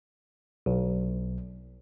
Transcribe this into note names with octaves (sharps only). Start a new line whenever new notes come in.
B1